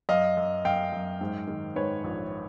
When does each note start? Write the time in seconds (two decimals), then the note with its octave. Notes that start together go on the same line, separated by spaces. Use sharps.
0.09 F#2 D#5 F5
0.37 F#2
0.65 F#2 F5 G5
0.92 F#2
1.21 G#2
1.48 D#3
1.76 G#2 B4 C#5
2.04 A#1